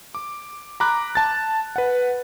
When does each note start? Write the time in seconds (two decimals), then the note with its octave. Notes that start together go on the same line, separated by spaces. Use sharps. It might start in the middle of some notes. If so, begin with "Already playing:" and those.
0.15 D6
0.80 A#5 B5 D6 F#6
1.15 A5 A6
1.76 B4 F#5